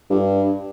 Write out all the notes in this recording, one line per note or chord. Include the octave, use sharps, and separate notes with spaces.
G2